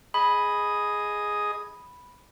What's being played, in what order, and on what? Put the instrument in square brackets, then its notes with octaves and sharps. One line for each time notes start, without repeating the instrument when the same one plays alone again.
[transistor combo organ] G#4 D#5 D#6 [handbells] B5